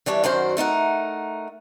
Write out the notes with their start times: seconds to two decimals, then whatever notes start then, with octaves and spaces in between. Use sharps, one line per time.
0.06 E3 G3 D4 C#5
0.24 F#2 D#3 F#4 C5 D5
0.57 A3 D#4 A#4 F#5